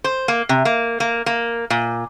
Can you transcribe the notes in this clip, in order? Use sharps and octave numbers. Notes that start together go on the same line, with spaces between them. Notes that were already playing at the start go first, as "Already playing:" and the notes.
C5
A#3
C3
A#3
A#3
A#3
A#2